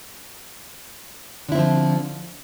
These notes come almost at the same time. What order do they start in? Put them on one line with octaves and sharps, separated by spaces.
D3 E4 C4 F3